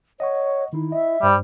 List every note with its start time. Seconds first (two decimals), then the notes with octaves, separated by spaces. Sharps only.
0.20 C#5 D#5 F#5 C#6
0.73 D#3 D#4 E4
0.92 D#5 E5
1.23 G2 G3 C5